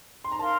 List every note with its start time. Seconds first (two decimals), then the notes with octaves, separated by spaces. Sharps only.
0.24 C6
0.32 A#5
0.39 A#4 F5 A5 C6